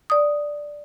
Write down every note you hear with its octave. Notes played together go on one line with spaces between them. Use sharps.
D5 D#6